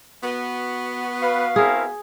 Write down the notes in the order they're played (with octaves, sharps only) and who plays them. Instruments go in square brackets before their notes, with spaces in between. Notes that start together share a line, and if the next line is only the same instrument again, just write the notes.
[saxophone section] B3 F#4
[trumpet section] B4 [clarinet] F5
[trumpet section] C4 E4 A#4 [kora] G#4